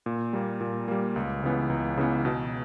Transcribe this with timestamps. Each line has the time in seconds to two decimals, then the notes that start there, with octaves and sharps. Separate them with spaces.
0.06 A#2
0.33 G3 A#3
0.61 A#2
0.88 G3 A#3
1.16 C#2
1.43 C#3 E3 B3
1.70 C#2
1.97 C#3 E3 B3
2.25 B2